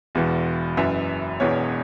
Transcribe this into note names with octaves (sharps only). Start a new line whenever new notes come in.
E1 E2 E3
F#1 F#2 E3 E5
E1 E2 E3 C#5